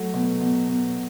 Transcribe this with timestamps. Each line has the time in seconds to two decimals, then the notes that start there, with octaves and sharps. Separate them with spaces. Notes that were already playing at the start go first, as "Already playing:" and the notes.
Already playing: F#3 A3
0.14 B2
0.41 B2
0.69 B2